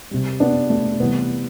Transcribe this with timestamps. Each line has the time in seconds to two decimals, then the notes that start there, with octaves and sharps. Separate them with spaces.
0.11 C3 G3
0.40 B3 D4
0.70 A3
1.00 C3 E3 G3 B3